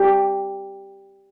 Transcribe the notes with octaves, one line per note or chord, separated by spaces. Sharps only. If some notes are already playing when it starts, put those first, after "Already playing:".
Already playing: G4